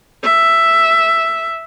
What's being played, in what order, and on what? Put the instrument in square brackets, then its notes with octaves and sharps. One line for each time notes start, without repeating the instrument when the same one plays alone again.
[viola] E5